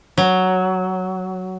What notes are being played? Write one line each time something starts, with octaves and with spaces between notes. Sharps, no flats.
F#3